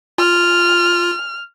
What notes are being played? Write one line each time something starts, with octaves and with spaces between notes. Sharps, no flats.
F4 F6